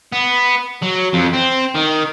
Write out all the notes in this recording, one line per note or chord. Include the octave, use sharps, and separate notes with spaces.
B3
F#3
F2
C4
D#3